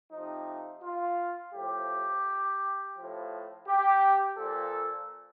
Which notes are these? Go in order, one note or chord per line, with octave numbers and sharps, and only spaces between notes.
C3 F3 D#4
F4
A2 F3 G4
A2 F3
G4
A#2 F3 A4